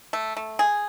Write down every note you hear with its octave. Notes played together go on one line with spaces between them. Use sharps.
A3
A3
G#4